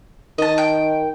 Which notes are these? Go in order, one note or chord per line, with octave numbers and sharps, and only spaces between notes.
D#3 D#5 A5
G5